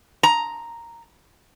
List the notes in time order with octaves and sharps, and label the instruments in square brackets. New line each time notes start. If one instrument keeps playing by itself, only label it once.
[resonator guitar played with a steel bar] A#5